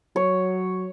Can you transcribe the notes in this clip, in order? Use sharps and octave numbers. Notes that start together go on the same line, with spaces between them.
F#3 C#5